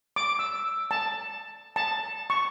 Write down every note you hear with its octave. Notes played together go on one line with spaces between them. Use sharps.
D6
E6
A5
A5
C#6